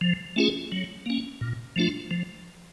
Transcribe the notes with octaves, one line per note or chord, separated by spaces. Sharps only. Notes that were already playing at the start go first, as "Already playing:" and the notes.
F3
A3 C#4 F4 G#4
F#3
A#3 C#4
A#2
F3 A3 D4 F4
F3